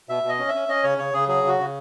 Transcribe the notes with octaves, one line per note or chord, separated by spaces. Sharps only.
B2 E5
B2
D#5
C#4
E5
C#4
C#4 D#5
C#3 C#5
C#3 C#5
C#3 G#4
F#3 G#4
C#3 F#4
C#3